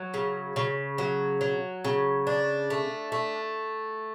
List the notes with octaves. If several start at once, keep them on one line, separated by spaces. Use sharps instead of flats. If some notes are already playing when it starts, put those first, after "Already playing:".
Already playing: F#3
C#3
C#3
F#3
F#3
C#3
D4
A3
A3